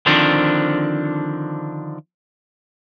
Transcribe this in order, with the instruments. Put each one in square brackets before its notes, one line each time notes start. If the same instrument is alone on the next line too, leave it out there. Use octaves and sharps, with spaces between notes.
[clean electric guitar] D3 D#3 F3 C4 D4